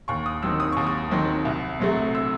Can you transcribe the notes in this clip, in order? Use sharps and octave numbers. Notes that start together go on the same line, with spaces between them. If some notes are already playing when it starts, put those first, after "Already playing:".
D#2 C#6
D#6
D#3 F#3 C4 E6
D#6
D#2 C#6
D#6
D#3 F#3 C4
C2
C3 F#3 A3
E6